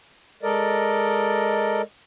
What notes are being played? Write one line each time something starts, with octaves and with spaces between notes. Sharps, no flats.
G#3 A4 A#4 D5 D#5